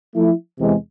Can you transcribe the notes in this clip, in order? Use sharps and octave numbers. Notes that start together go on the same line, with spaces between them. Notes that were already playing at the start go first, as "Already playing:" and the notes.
F3 A3 E4
E2 C3 E3 G#3